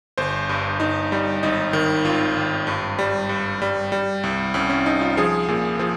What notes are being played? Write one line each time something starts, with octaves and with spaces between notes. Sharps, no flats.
G1 C5
G2
G1 D#4
G3
G#1 D#4
D#3
G#1 F4
G#1
G2
G3
G2
G3
G3
C2
C2 C#4
C#4
C2 D#4
F4
F3 G#4
A#2 G#4
F3 G#4